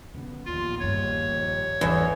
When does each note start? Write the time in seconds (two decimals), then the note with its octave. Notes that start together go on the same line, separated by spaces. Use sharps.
0.14 F#1 D3 B3
0.45 A#1 D#2 A#2 F4
0.80 A1 G2 C#5
1.81 G#1 E2 A#3